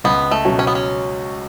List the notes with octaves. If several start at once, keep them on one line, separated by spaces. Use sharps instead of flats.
C#2 B3
A3
B2 F#3 C#4
C#4
B3
C#4